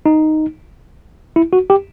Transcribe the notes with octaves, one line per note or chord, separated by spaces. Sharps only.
D#4
E4
F#4
G4